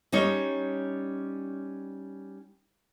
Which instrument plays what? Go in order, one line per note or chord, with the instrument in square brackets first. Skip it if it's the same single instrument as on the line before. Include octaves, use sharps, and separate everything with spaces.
[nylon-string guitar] G3 C#4 D#4 C#5